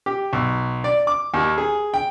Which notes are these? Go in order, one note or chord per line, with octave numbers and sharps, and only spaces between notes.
G4
B1
D5
D6
D#2
G#4
G5